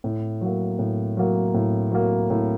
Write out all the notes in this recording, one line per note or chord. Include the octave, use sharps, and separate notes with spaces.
A2
F#3 A#3
A2
F#3 A#3
A2
F#3 A#3
A2